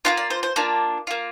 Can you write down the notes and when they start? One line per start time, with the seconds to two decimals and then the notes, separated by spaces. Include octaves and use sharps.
0.05 A#3 D4 F4 F5
0.17 D5
0.30 C5
0.43 C5
0.56 A#3 D4 F4
1.07 A#3 F4